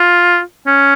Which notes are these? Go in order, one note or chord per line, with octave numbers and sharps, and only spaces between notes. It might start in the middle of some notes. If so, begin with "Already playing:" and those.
Already playing: F4
C#4